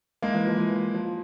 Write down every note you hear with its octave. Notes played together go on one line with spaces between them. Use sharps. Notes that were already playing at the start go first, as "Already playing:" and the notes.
G#3 A#3
E3
F3
E3
F3